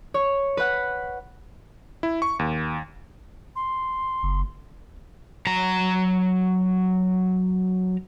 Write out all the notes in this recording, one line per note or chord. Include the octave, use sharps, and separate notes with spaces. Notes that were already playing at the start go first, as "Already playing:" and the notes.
C#5
B4 F#5
E4
C#6
D#2
C6
F#1
F#3 A#5